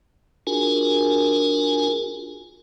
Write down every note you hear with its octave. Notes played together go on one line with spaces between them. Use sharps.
D4 F4 F#4 G#4 A#4 G#5